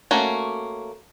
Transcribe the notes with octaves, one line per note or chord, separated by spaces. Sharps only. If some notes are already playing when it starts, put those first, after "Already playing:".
A3 A#3 C#4 F#4